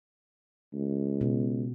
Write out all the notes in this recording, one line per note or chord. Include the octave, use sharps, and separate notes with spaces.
C#2
B2